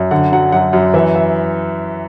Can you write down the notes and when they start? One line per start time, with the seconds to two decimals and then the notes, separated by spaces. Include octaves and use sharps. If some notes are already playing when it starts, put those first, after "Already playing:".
Already playing: F#2
0.11 D3 F#5
0.32 F#3 F#5
0.52 F#2 F#5
0.73 F#2
0.94 E3 E5
1.16 E5